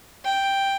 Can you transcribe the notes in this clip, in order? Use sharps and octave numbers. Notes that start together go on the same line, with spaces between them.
G5